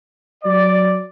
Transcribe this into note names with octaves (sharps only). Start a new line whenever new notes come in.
F#3 D5